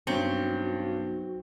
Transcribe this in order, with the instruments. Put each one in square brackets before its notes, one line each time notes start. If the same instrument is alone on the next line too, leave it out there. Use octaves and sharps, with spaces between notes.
[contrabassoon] B1 [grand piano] G2 C#4 C#7 [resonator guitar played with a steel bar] C4 [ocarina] F#4